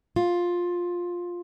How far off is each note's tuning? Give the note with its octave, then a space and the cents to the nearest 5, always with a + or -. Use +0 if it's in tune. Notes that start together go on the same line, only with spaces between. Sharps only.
F4 +10